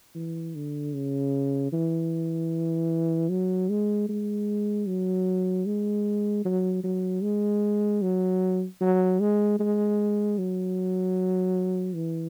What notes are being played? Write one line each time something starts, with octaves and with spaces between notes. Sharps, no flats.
E3
D3
C#3
E3
F#3
G#3
G#3
F#3
G#3
F#3
F#3
G#3
F#3
F#3
G#3
G#3
F#3
E3